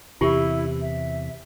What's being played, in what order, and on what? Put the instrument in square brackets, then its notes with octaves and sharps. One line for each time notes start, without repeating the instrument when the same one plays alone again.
[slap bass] E2 C3 [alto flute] E4 [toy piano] F4 G4
[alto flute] E5